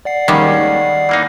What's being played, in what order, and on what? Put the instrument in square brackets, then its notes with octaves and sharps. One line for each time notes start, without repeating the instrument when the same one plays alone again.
[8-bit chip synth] D5 F#5 C7
[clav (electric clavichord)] D#2 G#3 C#4 [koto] D#3 G3
[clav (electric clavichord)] E3 A#3 D#4